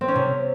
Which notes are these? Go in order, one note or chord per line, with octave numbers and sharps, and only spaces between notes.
C4
C#4
C3